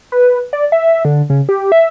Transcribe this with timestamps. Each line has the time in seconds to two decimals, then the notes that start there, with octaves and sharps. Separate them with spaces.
0.12 B4
0.53 D5
0.72 E5
1.05 D3
1.30 C#3
1.49 G4
1.72 E5